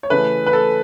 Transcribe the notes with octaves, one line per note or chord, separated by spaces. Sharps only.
C#5
C#3 E3 A3 B4
B4
A4